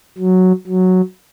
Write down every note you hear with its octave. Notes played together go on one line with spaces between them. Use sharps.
F#3
F#3